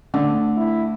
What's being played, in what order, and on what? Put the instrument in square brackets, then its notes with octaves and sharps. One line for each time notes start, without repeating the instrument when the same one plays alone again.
[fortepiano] D3 [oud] A3 C4
[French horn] E4